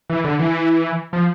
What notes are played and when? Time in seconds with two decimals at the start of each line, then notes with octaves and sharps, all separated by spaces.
0.10 E3
0.24 D3
0.39 E3
1.13 F3